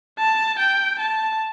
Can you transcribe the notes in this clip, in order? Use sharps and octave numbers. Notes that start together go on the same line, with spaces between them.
A5
G5
A5